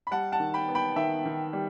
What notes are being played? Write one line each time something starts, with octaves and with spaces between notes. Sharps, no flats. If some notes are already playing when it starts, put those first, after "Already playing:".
B5
G3 F#5 A5
F#5 A5
D#3
G5 B5
B3
G5 B5
D#3 E5 G5
D#3
G3